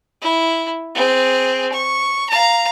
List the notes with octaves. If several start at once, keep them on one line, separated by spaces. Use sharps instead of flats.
E4
C4 G#4
C#6
F5 A#5